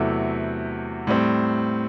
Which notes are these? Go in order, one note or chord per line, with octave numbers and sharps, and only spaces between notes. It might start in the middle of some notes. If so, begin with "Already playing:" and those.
Already playing: E2 C3 F#3 A3 E4
A2 G3 C4